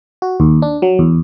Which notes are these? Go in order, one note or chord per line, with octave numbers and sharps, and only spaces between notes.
F#4
D#2
D4
F#3
E2